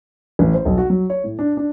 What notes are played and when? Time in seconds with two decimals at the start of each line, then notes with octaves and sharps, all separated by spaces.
0.39 A1
0.54 C5
0.65 B1
0.78 F#4
0.90 F#3
1.10 C#5
1.24 A2
1.39 D4
1.57 D4